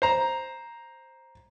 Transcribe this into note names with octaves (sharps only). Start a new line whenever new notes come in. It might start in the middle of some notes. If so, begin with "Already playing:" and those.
C5 A#5